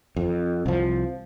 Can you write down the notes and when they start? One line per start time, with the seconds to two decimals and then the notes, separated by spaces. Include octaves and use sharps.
0.16 F2
0.66 C2 F3